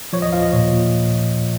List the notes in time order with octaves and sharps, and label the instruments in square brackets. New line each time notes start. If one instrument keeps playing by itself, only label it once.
[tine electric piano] F3 C#5
D#5
F3 F5
D#5
A#2 C#5
A#2